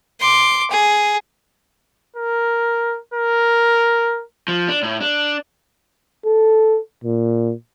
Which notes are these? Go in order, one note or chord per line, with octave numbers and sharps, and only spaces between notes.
C6 D6
G#4
A#4
A#4
F3
D4
A2
D4
A4
A#2